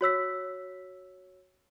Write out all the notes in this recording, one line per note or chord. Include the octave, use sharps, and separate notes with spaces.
F#4 C#5 E6 B6